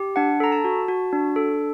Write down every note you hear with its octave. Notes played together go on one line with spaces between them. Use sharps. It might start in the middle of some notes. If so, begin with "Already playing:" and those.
Already playing: G4
D4 F#5
A4 A#5
A5
F#4
F#4
D4
A4